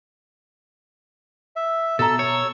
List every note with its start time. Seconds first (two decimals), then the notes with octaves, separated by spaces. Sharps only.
1.56 E5
1.99 B2 A4 A#5 E6
2.19 C#5